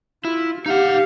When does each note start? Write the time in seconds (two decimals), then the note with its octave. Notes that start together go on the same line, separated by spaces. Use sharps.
0.25 E4 F4
0.66 D#4 G4 F5 F#5